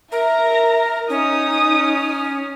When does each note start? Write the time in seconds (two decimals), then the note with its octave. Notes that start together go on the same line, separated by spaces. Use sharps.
0.12 A#4 E5 A#5
1.09 C#4 D#4 D#6